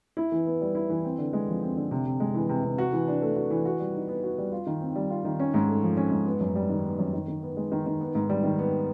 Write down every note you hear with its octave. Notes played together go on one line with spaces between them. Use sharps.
E4
E3
B3
G3
E4
E3
C4
D3
G#3
F3
C4
D3
C3
C3
G#3
E3
C3
C3
F#4
E3
D4
A3
F#4
E3
F#4
G3
D#4
B3
F#4
G3
F4
D#3
C4
G3
F4
D#3
C#4
G#2
A3
F3
C#4
G#2
B3
F#2
G3
D#3
B3
F#2
D#3
D#3
B3
G#3
D#3
D#3
B3
G#2
G3
D#3
B3